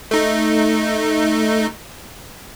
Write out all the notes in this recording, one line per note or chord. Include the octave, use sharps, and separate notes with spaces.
A3 D#4